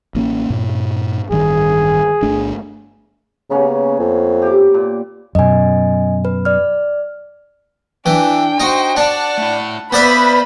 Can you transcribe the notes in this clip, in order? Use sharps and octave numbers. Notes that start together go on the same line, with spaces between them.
A1 A#3 C#4
G2 A#2
A1 G2 D#3 G#4
G1 A3 D4
C#3 A#3 B3 C#4
F2
G4 D6
A#2
F#2 B2 D#5 G#5
B4
D5 F6
E3 D4 G5
D#4 F#4 C5
D4 D5 F#5 A5
A3 E4
B3 B4 C5 D5 E5 F5 B5